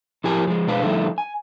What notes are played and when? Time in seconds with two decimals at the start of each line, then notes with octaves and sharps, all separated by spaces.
0.24 F3 E4 G4 A#4 G#5
0.47 F3 G#3
0.67 B2 G#3 D4 B4 C5 F5
0.82 D3 F3 G3 A3 D#4 E4
1.18 G#5